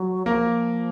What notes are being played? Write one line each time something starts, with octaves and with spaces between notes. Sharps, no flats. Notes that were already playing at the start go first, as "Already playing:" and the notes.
Already playing: F#3
F3 A#3 A#4